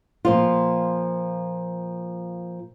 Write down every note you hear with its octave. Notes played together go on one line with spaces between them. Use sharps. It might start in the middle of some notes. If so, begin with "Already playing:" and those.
A#2 F3 F4